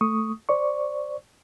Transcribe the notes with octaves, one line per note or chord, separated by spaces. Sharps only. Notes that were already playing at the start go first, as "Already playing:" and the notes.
A3 C#6 D#6
C5 D5 C#6